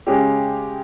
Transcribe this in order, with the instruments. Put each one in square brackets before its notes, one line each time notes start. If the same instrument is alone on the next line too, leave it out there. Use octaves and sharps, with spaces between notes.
[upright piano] C#3 G#3 C#4 G4